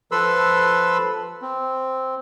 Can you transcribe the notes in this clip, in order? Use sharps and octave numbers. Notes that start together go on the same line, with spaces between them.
F3 A4 B4 B5 C6 E6
C4